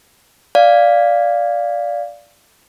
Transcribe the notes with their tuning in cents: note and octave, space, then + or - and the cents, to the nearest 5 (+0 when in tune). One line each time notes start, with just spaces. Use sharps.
D5 -5 F5 +0